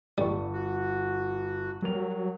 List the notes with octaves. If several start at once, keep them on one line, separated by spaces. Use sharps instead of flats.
G1 G3 C#6
F#4
F#3 G3 A#4 F7